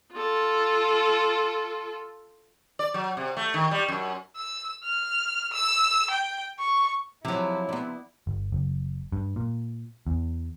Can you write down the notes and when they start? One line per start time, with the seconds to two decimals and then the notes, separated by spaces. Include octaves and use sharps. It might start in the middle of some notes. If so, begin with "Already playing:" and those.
0.14 F4 A4
2.79 D5
2.94 F#3
3.17 C3
3.37 A3
3.54 D#3
3.71 G3
3.88 F#2
4.36 E6
4.84 F6
5.52 E6
6.10 G5
6.59 C#6
7.25 C3 F3 F#3 E4
7.69 B3 D4
8.27 G1
8.52 F#1
9.12 G2
9.36 A#2
10.07 E2